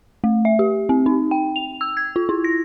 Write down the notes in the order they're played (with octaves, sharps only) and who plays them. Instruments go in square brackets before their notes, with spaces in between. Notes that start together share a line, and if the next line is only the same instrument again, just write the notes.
[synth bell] A3
E5
G4
C4
D#4
G5
F7
E6
G#6
F4
E4
A#6